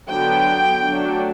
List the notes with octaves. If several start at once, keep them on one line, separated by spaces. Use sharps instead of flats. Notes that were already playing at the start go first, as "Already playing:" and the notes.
D3 F#3 B3 D4 G5
F#3 A3 D4